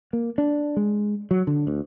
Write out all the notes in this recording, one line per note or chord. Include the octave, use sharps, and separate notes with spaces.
A#3
D4
G#3
F#3
D3
D2